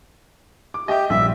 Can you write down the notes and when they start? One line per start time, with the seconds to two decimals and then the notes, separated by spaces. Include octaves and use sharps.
0.74 D6
0.88 G4 D#5 E5 D6
1.10 A#1 G2 G3 E5